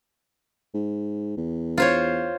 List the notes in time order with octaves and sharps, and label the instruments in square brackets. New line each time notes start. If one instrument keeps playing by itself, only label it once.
[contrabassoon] G#2
E2
[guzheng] F4 C5 C#5